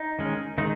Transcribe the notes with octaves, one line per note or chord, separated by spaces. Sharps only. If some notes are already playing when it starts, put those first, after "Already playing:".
Already playing: D#4
D#3 G#3 C#4
D#3 G#3 D#4